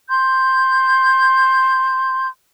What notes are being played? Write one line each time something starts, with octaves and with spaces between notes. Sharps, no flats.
C6 G6